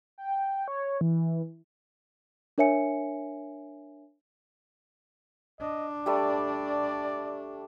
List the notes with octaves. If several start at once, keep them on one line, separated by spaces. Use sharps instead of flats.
G5
C#5
E3
D4 A#4 C#5 E5 G#5 C#7
D4 D#5
G3 A3 D5